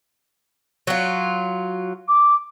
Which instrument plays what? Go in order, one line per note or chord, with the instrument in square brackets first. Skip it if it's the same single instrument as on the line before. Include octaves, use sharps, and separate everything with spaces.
[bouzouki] F#3 F4
[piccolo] D6